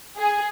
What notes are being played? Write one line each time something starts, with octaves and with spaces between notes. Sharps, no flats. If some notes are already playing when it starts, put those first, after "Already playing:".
G#4